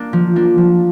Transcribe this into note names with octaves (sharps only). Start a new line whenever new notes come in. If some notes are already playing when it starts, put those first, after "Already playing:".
Already playing: A#3 D4
F3
A#3 D4
F3